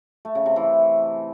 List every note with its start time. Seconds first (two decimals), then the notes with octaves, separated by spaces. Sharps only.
0.25 A3
0.35 C#3
0.46 C3
0.56 E3